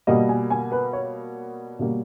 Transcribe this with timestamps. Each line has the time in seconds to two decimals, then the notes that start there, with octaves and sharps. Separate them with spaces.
0.07 B2 G3 A#3 D#5
0.29 G#5
0.50 G#5
0.72 B4
0.93 C#5
1.79 B2 G3 A#3